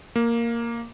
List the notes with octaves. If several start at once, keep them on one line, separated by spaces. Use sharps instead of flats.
A#3